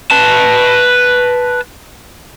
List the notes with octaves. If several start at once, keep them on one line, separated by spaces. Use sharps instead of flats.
B4 A5